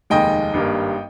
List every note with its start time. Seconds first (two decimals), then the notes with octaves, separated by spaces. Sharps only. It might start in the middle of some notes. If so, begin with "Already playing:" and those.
0.10 F1 D#2 D#3 G#3 D#5 G5
0.53 G#1 G2 G3 A#3